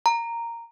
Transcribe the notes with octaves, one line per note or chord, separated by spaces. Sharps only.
A#5